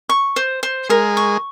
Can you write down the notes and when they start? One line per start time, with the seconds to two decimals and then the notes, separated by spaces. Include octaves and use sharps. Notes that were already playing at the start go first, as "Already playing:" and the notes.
0.09 C#6
0.36 C5
0.63 C5
0.89 G#3 A#4
1.17 C#6